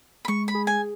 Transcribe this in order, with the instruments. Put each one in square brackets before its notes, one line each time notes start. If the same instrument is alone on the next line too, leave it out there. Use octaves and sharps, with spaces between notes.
[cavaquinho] B5
[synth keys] G#3 [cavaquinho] C#6
[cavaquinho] B5
[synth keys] G#4
[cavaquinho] G#5